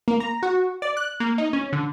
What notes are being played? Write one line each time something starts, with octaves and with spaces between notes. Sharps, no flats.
A#3
A#5
F#4
D5
F#6
A#3
D#4
C#4
D3